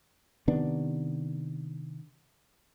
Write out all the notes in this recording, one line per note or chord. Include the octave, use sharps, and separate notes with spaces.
C3 D#3 B3 D4